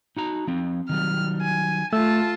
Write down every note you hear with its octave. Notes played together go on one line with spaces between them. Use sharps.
D#4 F#4 A#5
F3 C4
D#3 F#3 G3 F6
G#5
A3 F4 A5 E6